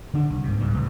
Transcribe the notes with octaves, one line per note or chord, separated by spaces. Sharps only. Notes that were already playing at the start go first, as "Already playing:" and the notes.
D3 D4
C2
G#2 C3
C#2 G#2 G3
C#2 A2 C#3